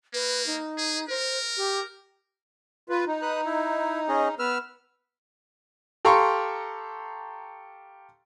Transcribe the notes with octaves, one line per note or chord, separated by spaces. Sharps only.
A#3 B4
D#4
G#4
A#4 C5
G4
F4 B4
D#4
B4 D#6 F#6
E4
C#4 G#4 D#5
B3 B4 E6 F6
G4 A4 F5 A#5 C6 C#6